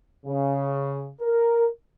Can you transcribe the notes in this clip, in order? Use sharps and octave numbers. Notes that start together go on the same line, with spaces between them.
C#3
A#4